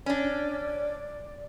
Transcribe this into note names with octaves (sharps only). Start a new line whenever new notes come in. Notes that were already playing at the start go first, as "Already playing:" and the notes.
C#4 D4 D5